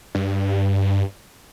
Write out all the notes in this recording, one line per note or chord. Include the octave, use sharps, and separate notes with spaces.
G2